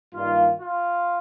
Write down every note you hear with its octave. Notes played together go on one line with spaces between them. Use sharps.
G2 D#3 G3 A#3 D4 F4
F4